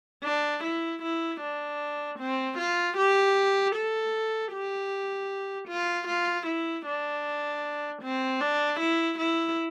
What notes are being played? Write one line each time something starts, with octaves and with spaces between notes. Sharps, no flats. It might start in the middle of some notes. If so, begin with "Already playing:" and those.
D4
E4
E4
D4
C4
F4
G4
A4
G4
F4
F4
E4
D4
C4
D4
E4
E4